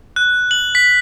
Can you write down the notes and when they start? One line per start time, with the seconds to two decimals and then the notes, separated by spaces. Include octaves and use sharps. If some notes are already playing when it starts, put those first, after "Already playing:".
0.16 F#6
0.51 F#7
0.75 B6